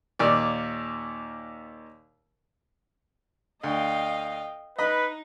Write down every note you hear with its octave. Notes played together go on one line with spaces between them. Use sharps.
D#2 A#2 D5
D2 D#5 F5 G5
D#4 B4 D#5 B5